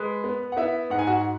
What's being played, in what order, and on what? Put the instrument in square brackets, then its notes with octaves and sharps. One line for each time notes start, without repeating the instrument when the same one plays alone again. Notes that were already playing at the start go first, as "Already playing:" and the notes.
Already playing: [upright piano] G#3 B4
B3
F#5
B3 E4 E5
G#2 F#5
G#5
F#4 F#5